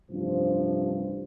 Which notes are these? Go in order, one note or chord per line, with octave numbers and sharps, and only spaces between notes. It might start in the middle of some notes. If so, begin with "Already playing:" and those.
A1 G2 C3 F3 C5